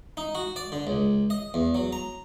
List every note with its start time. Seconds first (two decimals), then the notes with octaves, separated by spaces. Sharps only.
0.17 D#4
0.35 F#4
0.56 D5
0.72 D3
0.87 C#2
1.30 D#5
1.54 E2
1.75 F#3
1.93 A#5